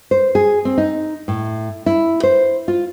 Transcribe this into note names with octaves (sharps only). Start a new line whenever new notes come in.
C5
G#4
C4
D#4
A2
E4
C5
F4